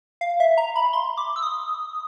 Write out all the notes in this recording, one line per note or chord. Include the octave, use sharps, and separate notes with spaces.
F5
E5
A#5
B5
C6
D6
E6
D#6